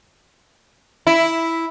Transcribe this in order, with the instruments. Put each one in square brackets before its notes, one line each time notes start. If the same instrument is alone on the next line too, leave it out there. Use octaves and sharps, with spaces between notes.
[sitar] E4